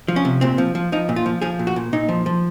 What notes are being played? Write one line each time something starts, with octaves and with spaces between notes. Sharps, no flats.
F3
C#4
C3
A#2 C4
F3
F3
F3 D#4
A#2
F4
F3
F3 G#4
A#2
F#4
A#2
A#2 D#4
F3
F3